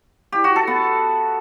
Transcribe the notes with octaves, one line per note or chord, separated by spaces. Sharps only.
G4
F#4
A4
B3